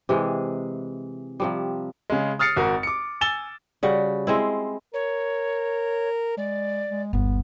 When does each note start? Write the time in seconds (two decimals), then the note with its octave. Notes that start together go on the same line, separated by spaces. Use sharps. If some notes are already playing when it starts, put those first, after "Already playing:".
0.09 C3 E3 G#3
1.40 C3 F3 G3
2.10 C#3 G#3
2.39 D#6 F6 A6 C7 C#7
2.56 G#1 F#4 A#4 D#6
2.83 D6 C#7
3.21 G#5 E6 A6 E7 G7
3.83 C#3 G3 F#4
4.27 G#3 C4 E4
4.94 A#4 C#5
6.37 G#3 D5
6.90 G#3
7.13 G1 D#2 B3